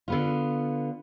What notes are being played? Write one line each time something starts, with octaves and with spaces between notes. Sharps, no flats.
D3 B3 F4